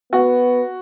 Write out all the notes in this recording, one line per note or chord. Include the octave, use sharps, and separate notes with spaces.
B3 F#4